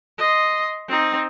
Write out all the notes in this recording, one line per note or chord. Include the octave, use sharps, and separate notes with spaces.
D#5 C6
C4 D#4